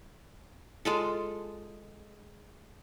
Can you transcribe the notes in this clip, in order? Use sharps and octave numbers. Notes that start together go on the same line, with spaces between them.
G#3 F4 A4